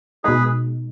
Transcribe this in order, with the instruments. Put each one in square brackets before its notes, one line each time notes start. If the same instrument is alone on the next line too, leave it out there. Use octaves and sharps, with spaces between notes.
[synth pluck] B2 G#3 D#4 [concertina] G#4 B4